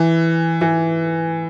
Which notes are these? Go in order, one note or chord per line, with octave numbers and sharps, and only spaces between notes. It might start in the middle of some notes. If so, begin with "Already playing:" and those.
Already playing: E3
E3